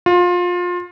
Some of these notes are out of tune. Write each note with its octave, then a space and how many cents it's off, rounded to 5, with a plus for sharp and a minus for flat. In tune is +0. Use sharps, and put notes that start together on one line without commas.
F4 +25